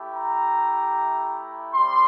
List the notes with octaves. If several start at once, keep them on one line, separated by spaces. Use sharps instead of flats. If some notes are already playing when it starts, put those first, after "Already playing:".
Already playing: A3 E4 G4
A#5
G3 C4 G4 C6